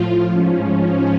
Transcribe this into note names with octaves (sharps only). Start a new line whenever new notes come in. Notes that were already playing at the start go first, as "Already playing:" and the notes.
Already playing: A2 F3 F4
G#2 F3 C#4
C#4